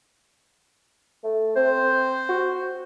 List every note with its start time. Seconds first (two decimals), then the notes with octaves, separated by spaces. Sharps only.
1.24 A3
1.56 C4 C5
2.29 F#4